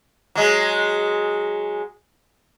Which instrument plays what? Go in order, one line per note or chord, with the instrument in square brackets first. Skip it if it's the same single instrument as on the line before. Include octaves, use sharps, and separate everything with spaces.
[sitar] F#3 G#3